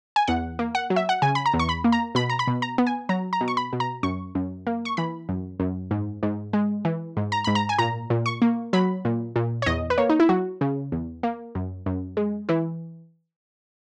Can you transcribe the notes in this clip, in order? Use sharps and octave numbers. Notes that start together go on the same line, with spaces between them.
G#5
E2 F#5
A#3
F#5
F#3
E5
F#5
C#3 G#5
B5
A#5
E2
C#6
B5
A#3
A#5
B2 B5
A#5
B5
B2
A#5
B3
G#5
F#3 A#5
A#5
B2
C#6
B5
B2
A#5
F#2 C#6
F#2
A#3
C#6
E3 B5
F#2
F#2
G#2
G#2
G#3
E3
G#2
A#5
G#2 B5
A#5
G#5
A#2 A#5
A#2
C#6
A#3
F#3 B5
A#2
A#2
C#5
E2 D#5
B4
A#3 C#5
D#4
E4
F#3 F#4
C#3
E2
A#3
F#2
F#2
G#3
E3 E4